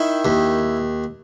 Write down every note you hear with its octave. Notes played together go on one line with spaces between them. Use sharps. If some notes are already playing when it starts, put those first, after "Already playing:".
Already playing: D#3 E4
D#2